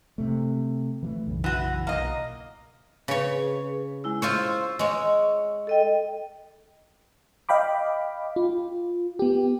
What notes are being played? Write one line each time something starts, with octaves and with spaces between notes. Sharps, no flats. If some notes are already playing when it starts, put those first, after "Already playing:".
C3 A3
E3 F3 A3
B1 F#2 C#3
E3 F#4
B1 A#3 D#5
C#3 G#4 B4 C#5
G#3 E4 E6
F4 C5 C#5 E6
G#3 C#5
A4 D#5 G5
D#5 F5 G5 B5 D6
F4
B3 G4